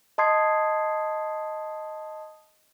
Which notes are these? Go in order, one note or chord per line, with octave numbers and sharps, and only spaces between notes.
D#5 A5 C6 D#6 G#6 C7